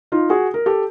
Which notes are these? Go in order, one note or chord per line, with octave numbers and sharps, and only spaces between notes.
D#4 F4
F#4 G#4
A#4
G4 A4